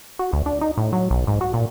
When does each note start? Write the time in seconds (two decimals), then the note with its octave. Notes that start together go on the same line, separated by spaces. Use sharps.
0.19 F#4
0.33 D2
0.46 D4
0.61 D#4
0.77 A2
0.93 F#3
1.11 B1
1.27 G#2
1.41 F#4
1.54 A#2